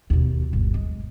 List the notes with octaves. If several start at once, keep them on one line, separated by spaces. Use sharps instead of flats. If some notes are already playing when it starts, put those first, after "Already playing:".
D#2 B2
G1 D#2
G#3